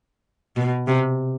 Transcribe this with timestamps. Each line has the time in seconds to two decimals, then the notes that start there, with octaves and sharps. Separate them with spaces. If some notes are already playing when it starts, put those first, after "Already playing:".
0.56 B2
0.88 C3